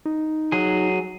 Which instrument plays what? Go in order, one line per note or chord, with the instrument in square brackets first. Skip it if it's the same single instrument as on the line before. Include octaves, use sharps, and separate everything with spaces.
[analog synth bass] D#4
[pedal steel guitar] F#3 G#4